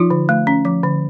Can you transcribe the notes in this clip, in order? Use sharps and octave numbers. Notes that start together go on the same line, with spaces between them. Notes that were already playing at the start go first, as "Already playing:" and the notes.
Already playing: F3 D#4 F4
D3
A3
C#4
F3
D3